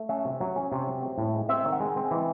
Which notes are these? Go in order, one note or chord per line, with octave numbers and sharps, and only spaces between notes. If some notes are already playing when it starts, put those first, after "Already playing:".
Already playing: A3
C#4 E5
C3
F#3
C#4
C3
F#3
C4
A2
G#3
C4 E5
D#3
F#5
G#3
C4
E3